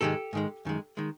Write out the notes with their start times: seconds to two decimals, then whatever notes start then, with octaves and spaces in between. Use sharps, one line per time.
0.01 G#2 D#3 G#3 G4 A4
0.33 G#2 D#3 G#3
0.65 F#2 D#3 G#3
0.97 D#3 G#3